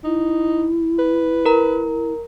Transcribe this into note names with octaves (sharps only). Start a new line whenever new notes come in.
D#4 E4
B4
A#4 A#5